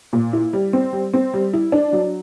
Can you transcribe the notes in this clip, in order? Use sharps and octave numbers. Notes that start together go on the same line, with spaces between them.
A#2
E4
G3
C4
G3
C4
G3
E4
D4
F#3